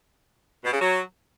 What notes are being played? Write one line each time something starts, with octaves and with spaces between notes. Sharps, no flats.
B2
C#3
F#3